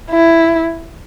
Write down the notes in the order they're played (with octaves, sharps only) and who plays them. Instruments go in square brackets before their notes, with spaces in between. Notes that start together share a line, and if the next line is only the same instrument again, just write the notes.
[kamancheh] E4